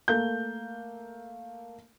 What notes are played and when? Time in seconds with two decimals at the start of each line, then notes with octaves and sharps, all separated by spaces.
0.08 A3 A#3 G6